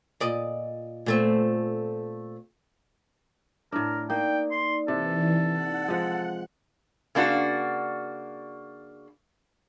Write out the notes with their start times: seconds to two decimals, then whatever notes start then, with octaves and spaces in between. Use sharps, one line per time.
0.20 A#2 D5 D#5
1.06 A#2 A3 C4
3.72 A2 D4 A#4
4.10 A#3 D#4 D5 G5
4.51 C6
4.88 C3 E3 A4
5.47 F#5
5.88 F3 G#3
7.15 C#3 A#3 D4 F#4